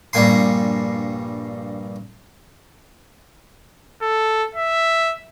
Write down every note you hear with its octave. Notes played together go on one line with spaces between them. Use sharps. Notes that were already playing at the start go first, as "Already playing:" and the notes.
A#1 G2 G3 A#3 G#5 C6
A4
E5